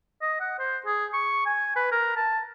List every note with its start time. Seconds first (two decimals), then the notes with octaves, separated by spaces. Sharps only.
0.22 D#5
0.40 F#5
0.59 C5
0.86 G#4
1.14 C#6
1.46 G#5
1.76 B4
1.92 A#4
2.17 A5